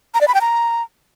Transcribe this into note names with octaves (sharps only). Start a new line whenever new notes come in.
A#5
D5
B5
G5
A#5